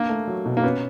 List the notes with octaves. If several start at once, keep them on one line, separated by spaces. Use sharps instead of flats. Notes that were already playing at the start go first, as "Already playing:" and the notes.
Already playing: A#3 D4
A3
F#3
B2
A#3
B3 C#4